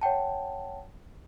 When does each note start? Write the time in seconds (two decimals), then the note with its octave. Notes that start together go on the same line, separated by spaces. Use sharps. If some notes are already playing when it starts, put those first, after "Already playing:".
0.01 C#5 F#5 G5 A5